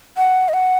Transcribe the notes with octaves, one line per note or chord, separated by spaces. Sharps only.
F#5
D#5
F#5